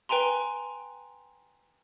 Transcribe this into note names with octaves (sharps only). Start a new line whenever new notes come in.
B4 G5 G#5 A#5 C6